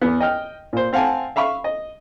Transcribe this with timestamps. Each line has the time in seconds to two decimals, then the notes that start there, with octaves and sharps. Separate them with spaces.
0.01 E2 B3
0.20 D#5 G5 F6
0.73 A#2 C5
0.93 C4 F5 F#5 G#5 A5
1.36 E5 F5 B5 C#6
1.64 D#5